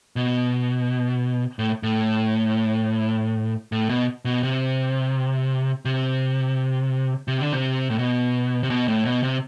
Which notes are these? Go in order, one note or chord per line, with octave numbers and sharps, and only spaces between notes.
B2
A2
A2
A2
B2
B2
C3
C3
C3
D3
C3
A2
B2
C3
B2
A2
B2
C3